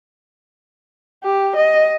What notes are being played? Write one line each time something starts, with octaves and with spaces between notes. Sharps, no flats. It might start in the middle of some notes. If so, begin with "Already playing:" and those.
G4
D#5